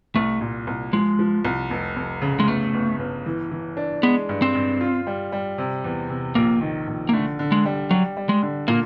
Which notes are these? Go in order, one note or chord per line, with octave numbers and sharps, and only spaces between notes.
C2 A3
A#2
C2
F3 G#3
F3
C2
F1
F1
C#3
G#3
G1 A3
G1
G1
E3
E3
D4
G#3 B3
G2
C4
G2
F4
G3
G3
C3
E2
C3
A#1 A#3
D#3
A#1
A#3
D3 A3
D3
G#3
G3
F#3 G3
G3
G#3
D3
A#2 A#3